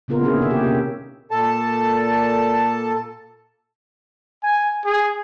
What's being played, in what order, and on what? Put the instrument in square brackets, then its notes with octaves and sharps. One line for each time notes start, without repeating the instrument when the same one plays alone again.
[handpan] A#2 C#3 B3 F4 A#4
D3 A#3 B3 C#4 E4 G#4
C3 D#3 E5
G4
C3 C#4
[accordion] A#2 A4 A5
[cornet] G#5
G#4